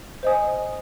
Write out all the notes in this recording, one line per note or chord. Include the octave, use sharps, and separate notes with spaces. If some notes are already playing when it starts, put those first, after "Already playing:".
C5 D#5 G#5 D#6